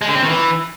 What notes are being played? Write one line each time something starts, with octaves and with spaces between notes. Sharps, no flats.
G#3
D3
C4
D#3
E3